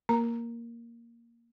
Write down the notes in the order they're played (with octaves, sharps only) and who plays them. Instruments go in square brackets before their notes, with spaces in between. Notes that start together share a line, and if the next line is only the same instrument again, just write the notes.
[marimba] A#3 A#4 A#5